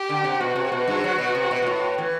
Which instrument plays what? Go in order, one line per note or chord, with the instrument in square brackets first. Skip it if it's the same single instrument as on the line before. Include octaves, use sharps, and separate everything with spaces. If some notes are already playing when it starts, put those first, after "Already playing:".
Already playing: [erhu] G4
[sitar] D3
C3
[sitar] B2 [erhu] F#4
[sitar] C3
B2
G2
F#3
B2
C3
B2
B2
A2
E3